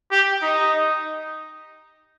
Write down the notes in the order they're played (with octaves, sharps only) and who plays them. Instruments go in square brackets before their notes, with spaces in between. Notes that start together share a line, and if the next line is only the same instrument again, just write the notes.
[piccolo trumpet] G4
D#4